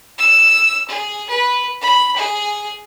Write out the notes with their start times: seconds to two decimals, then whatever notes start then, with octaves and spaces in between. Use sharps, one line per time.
0.18 E6
0.88 G#4
1.29 B4
1.81 B5
2.16 G#4